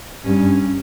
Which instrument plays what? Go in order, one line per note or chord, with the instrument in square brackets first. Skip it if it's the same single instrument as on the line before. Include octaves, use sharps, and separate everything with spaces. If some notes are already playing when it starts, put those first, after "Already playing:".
[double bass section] G2 [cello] C#4